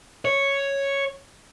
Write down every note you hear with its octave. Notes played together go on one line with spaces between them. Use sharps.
C#5